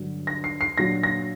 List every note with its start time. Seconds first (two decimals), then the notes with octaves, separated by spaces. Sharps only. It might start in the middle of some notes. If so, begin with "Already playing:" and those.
Already playing: G2 D3 F#3
0.27 A#6
0.44 C7
0.61 C7
0.78 A#2 F#3 A#3 D4 A#6
1.03 A#6